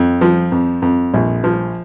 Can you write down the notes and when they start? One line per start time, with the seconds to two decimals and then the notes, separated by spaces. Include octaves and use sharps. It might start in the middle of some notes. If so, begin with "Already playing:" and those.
Already playing: F2
0.21 F3
0.52 F2
0.82 F2
1.14 A#1
1.44 F3